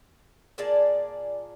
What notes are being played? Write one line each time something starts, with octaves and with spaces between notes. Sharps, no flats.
A#2 G#4 D5 A5